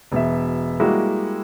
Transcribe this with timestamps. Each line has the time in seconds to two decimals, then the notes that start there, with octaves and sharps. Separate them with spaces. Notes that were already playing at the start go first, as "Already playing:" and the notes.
0.12 E1 B2 E5
0.80 G3 G#3 A#3 E4 F#4